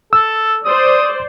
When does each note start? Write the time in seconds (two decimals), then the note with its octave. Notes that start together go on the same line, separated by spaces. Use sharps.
0.13 A4 E6
0.65 C5 D5 D#6